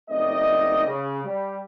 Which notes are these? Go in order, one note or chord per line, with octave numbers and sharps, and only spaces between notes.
F#1 A3 C4 D#4 D5 D#5
C#3
G3